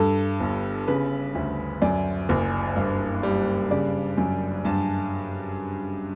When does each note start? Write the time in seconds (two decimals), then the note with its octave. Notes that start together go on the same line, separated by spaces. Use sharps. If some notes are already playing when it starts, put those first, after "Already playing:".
Already playing: G2 A4
0.40 G1
0.88 C#3 B4
1.35 D2
1.82 F#2 D5
2.29 F#1
2.76 G2
3.23 G3
3.71 C#3 D5
4.18 F#2
4.65 G2 A5